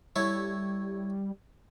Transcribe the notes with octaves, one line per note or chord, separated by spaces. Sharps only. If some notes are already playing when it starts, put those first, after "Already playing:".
G3 A3 E4 C#5